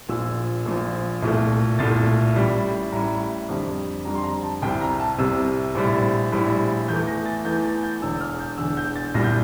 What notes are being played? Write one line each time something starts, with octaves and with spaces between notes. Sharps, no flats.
A#1 A#2 F3 E6
A#1 A#2 F3
C2 A#2 A3
C2 A#2 A3 A6
A1 A2 G3
A1 A2 G3 A#5
F2 D3 G3
F2 D3 G3 A#5
C6
A#5
A5
C2 C3 G3 G5
A#5
A5
C2 C3 G3 E6
A#1 A2 G3
A#1 A2 G3
E2 E3 A3 G6
A#6
A6
E2 E3 A3 G6
A6
G6
E1 E2 D3 E6
F6
G6
E1 E2 D3 E6
G6
A6
C2 A#2 G3 A#6
G6